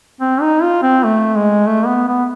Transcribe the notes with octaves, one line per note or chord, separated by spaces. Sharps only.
C4
D#4
F4
C4
A3
G#3
A3
B3
B3